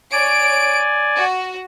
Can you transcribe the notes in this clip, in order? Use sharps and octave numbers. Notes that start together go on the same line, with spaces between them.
C#5 D5 G#5 D7
F#4